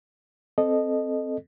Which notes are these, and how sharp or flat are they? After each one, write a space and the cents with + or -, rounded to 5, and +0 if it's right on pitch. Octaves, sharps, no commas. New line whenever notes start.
C4 +0 A4 -10 D#5 -15